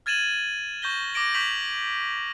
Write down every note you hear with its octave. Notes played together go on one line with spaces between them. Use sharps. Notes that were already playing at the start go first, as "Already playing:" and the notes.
F6 G#6 A6 D#7 E7 F#7
C#6 G6 A#6 G7
D6 A#6 D7 F#7
C#6 G6 B6 F7 F#7